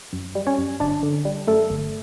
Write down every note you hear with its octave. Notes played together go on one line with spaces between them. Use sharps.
F#2
G3
C#4 C#5
F#2
G1 D4 D5
D3
G3
F#2 A3 A4
G1